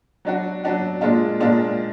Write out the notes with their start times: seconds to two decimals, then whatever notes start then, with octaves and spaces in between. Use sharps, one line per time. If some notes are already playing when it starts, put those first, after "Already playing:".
0.25 F#3 D4 F#4
0.64 F#3 D4 F#4
1.01 A#2 G#3 D4 F4
1.40 A#2 G#3 D4 F4